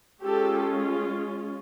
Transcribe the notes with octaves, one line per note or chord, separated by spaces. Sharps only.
G#3 C#4 F4 G4 A4